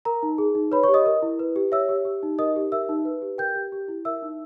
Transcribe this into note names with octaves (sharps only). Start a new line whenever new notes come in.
A#4 A#5
D#4
G#4
D#4
B4 C#5 B5
C#5 C#6
G4
D#5 D#6
A#4
E4
B4
G4
C#5 E5 E6
G4
G4
D#4
A#4 D#5 D#6
G4
A#4 E5 E6
D#4
B4
G4
A#4 G5 G6
G4
G4
E4
A#4 E5 E6
D#4